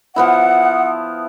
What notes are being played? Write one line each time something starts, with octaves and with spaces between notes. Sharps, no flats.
F3 B3 E4 F#5